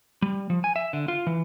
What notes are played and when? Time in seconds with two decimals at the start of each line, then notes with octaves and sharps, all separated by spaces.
0.22 G3
0.50 F3
0.64 G#5
0.76 E5
0.93 D3
1.08 F4
1.27 E3